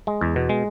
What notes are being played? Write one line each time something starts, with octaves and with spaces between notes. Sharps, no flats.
G#3
E2
B2
G#3